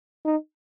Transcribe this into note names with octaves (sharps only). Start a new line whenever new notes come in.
D#4